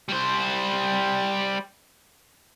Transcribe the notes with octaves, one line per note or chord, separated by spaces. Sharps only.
G3 C5